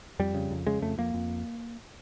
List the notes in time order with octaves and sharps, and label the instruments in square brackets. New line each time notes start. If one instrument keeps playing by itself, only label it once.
[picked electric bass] F2 G3
C#3
F2
C#3 G#3
F2 A3
F2 A#3
F2